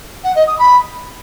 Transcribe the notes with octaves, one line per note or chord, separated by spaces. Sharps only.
F#5
D#5
D#6
B5